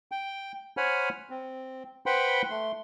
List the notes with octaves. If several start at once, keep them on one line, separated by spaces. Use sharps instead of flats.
G5
C5 C#5 F#5 G#5 B5 F6
C4
B4 C5 F#5 G5 B5 C6
A3 C6